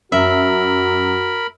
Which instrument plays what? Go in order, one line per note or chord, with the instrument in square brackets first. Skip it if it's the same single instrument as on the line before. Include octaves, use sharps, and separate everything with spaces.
[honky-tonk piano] F#2 [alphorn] F#4 [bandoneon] A#4 B5 [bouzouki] E5